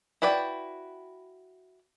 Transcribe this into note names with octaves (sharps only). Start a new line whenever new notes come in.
E4 F#4 B4 D5 G5